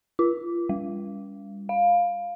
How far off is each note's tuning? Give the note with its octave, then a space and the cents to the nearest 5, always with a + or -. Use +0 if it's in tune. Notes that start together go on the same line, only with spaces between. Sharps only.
F4 -35
G3 +40
F5 +5